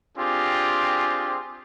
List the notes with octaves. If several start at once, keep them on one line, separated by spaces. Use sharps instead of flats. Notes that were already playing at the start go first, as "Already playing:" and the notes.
C4 D4 F4 G4 G#4